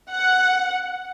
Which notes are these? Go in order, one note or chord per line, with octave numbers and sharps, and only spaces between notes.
F#5